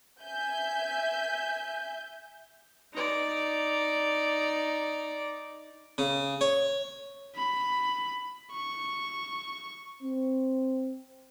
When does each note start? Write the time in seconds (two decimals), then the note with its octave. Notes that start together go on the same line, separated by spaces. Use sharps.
0.22 E5 G#5 G6
2.93 D#4 D5
5.98 C#3
6.41 C#5
7.35 B5
8.52 C#6
10.03 C4